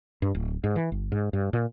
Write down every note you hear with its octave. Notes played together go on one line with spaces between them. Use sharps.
G2
D1
G#2
E3
G1
G#2
G2
A#2